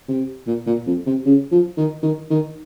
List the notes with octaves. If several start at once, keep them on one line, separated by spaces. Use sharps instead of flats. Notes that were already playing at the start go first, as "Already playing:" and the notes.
C3
A#2
A#2
F2
C3
C#3
F3
D#3
D#3
D#3